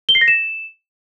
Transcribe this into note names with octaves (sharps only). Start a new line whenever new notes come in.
G7
C7
A#6
E7